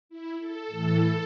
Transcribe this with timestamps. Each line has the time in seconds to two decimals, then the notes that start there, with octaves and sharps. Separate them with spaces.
0.09 E4
0.38 A4
0.67 A2 E3